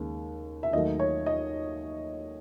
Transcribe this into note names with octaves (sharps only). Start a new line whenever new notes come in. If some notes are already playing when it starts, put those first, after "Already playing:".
Already playing: D#2 C#3 G#3
E5
D#2 D#3 F#3 A3 D#5
C#5
D#5